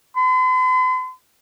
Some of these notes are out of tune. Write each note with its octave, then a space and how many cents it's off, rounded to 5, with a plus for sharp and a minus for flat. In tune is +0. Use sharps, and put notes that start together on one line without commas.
C6 -45